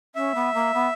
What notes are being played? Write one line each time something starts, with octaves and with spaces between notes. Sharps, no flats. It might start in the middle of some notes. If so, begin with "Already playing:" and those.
C#4 E5
B3
A#3
B3